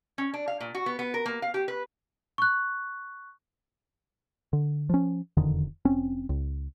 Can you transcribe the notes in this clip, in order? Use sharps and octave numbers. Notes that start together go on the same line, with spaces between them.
C#4
D4
F5
A#2
F#4
B3
B3
A#4
A#3
F5
G4
B4
C#6 F#6
D3
F3 C#4
E1 F2 D3 D#3
F1 C4 C#4
C#2